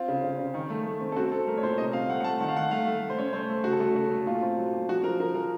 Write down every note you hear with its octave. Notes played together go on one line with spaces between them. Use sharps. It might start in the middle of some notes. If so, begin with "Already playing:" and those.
Already playing: C4 F4
C#3
C#3
C#3
D#3
A3
A3
C4
A4
C4 F#4
C4 A4
A3 A#4
C#5
A#2 C5
C3 D#5
C4 F5
A3 F#5
F#5
A3 A5
D#3 F#5
F5
D#3 F#5
A3 F5
A3
A3
C5
C#4 C#5
A3 C5
A3
C#3 F#4
A4
A3 F#4
C#3 F#4
A3
A#2 F4
C4
F#3
A#2
F3 F#4
F3 A#4
F3 A#4
F3 A#4